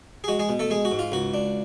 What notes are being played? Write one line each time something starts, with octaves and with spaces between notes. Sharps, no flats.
G#4
G#3 F#4
G#3 G#4
B2
A3 A4
G#3 G#4
F#4
G#2
F4
C#2 F#4
D4